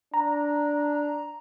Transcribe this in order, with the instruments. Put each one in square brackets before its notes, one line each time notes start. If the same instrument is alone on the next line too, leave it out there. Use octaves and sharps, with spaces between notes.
[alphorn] D4 [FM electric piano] A#5